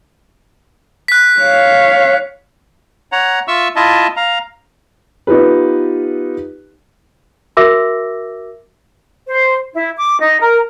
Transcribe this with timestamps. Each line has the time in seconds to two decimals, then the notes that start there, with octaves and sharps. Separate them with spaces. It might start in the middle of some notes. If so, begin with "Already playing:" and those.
1.08 F#6 B6
1.40 C#5 F5
3.12 C#5 F#5 A#5
3.48 F4 E5 C#6 E6
3.76 E4 F4 D#5 E5 A5
4.16 F5 A#5
5.27 B3 D#4 F4 G4 B4
7.57 F#4 A#4 E5 D6 E6 A#6
9.27 C5
9.74 E4
9.98 D6
10.20 D#4
10.40 A#4